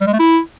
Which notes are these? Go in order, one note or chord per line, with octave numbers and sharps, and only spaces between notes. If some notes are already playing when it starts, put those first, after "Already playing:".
G3
G#3
A3
E4